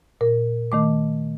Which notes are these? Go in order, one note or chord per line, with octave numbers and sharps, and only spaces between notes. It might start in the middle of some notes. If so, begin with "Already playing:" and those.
A#2 A#4
D#3 A3 D6